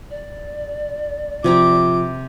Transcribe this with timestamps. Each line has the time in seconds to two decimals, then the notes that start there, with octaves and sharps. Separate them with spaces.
0.10 D5
1.44 C3 F3 C4 A#5 D6